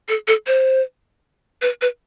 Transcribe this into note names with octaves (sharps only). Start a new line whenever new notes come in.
A4
A4
C5
B4
B4